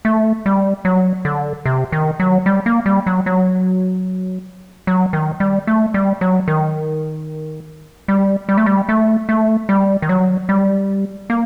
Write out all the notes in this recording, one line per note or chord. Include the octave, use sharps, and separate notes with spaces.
A3
G3
F#3
D3
C3
D#3
F#3
G3
A#3
G3
F#3
F#3
F#3
D#3
G3
A3
G3
F#3
D#3
G3
G3
A3
G3
A3
A3
G3
D#3
F#3
G3
A#3